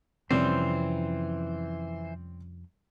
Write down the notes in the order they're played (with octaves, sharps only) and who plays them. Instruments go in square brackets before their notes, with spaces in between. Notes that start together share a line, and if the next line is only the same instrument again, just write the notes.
[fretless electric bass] F2 C3 C#4 [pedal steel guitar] E3 C5 [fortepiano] G3 C4